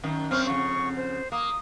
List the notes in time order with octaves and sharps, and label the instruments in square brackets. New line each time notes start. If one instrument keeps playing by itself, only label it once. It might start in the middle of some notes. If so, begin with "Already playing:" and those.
[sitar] F#2 D#3
[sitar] F#2 C4 C#4 [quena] F6
[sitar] F2 C#3 [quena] C#6
[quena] C5
[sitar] A#3 [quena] D#6